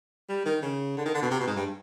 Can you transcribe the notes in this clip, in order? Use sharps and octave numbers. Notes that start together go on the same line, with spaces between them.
G3
D#3
C#3
D3
D#3
D3
B2
C3
B2
G#2
G2